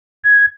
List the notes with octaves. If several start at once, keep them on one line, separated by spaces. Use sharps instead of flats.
G#6